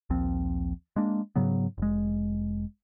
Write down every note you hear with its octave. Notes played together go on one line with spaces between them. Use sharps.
A#1 D#2 F3 C4
G#3 A#3 D4
G#2 C#3 F#3 B3
F1 G#3